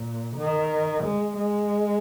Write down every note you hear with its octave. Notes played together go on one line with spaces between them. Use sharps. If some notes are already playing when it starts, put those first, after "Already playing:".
Already playing: A#2
D#3
G#3
G#3